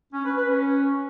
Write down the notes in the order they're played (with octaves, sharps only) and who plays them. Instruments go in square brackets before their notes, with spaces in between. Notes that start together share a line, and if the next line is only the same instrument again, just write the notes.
[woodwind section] C#4
B4
B4
C#4